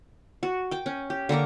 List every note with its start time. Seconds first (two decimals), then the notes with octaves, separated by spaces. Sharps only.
0.43 F#4
0.71 G5 D6
0.86 C#4
1.10 G4
1.29 D3 A#3 A#4 D6